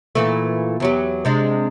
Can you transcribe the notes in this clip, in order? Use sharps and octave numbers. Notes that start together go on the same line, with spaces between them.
A#2 E3 A3
E2 F#3 G4
C3 G#3 D4